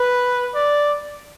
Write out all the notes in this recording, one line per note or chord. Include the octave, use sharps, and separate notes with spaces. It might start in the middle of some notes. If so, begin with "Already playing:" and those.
Already playing: B4
D5